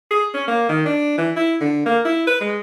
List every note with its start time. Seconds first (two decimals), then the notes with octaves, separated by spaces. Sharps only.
0.11 G#4
0.34 C#4
0.48 A#3
0.69 D#3
0.86 D4
1.18 E3
1.36 E4
1.61 D3
1.86 A#3
2.05 E4
2.27 B4
2.41 G#3